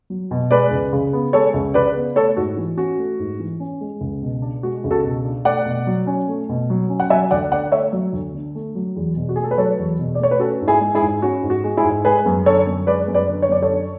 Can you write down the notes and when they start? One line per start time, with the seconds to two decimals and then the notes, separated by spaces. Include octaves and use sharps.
0.10 F#3
0.31 B2
0.51 G#3 B4 D5
0.71 C#2
0.93 C#3
1.13 B3
1.33 G#3 A4 C#5
1.54 C#2
1.74 C#3 B4 D5
1.95 B3
2.16 A3 A4 C#5
2.37 G#2 F#4
2.57 E3
2.77 C#4 F#4
2.99 A3
3.19 G#2
3.40 E3
3.60 C#4
3.81 G#3
4.01 C#2
4.22 B2
4.42 D4
4.63 G#3 F#4
4.84 C#2
4.91 F#4 A4
5.04 B2
5.25 D4
5.45 A3 D5 F#5
5.66 B2
5.87 F#3
6.07 C#4
6.28 A3
6.49 B2
6.70 F#3
6.90 C#4
7.00 F#5
7.10 F#3 E5 G#5
7.31 D2 D5 F#5
7.51 D3 D5 F#5
7.72 A3 C#5 E5
7.93 F#3
8.13 D2
8.35 D3
8.55 A3
8.75 F#3
8.96 E2
9.16 B2
9.29 F#4
9.36 A3 G#4
9.44 A4
9.51 B4
9.57 F#3 A4 C#5
9.79 E2
9.99 B2
10.15 D5
10.19 A3 C#5
10.31 B4
10.40 C#4 F#4 A4
10.61 G#2
10.67 E4 G#4
10.81 G#3
10.95 E4 G#4
11.01 G#2
11.22 C#4 F#4
11.43 G#2
11.50 F#4
11.64 G#3
11.77 E4 G#4
11.84 G#2
12.05 G#3 G#4 B4
12.26 F#2
12.46 D3 A4 C#5
12.67 F#2
12.87 G#3 B4 D5
13.08 F#2
13.14 B4 D5
13.29 D3
13.42 C#5
13.49 F#2 D5
13.62 A4 C#5
13.70 D4